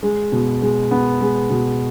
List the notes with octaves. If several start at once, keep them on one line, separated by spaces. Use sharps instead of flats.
G#3
B2
G#3
B3
G#3
B2